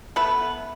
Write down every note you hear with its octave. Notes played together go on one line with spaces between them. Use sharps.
A3 B3 B4